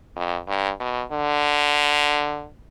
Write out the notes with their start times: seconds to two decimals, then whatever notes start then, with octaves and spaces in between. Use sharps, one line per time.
0.16 F2
0.48 G2
0.80 B2
1.12 D3